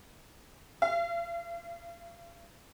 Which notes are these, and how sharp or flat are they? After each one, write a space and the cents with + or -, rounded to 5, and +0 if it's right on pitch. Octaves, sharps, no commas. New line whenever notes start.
F5 -35